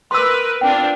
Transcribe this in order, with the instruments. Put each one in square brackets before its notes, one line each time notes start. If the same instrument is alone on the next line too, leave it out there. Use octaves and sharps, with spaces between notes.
[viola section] A#4 B4 [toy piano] C6 E6
[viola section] C4 D4 F4 [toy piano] G5